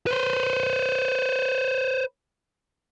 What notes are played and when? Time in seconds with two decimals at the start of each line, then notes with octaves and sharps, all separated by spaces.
0.07 B4 C5